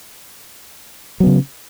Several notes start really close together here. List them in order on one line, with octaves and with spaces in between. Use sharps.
F#3 B3 C#3